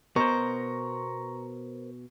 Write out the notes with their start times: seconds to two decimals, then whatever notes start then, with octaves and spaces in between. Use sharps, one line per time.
0.16 B2 A#4 C5 A#5 C#6